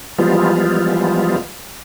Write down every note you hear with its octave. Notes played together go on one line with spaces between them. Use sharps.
E3 F3 G3 G#3 B3 F4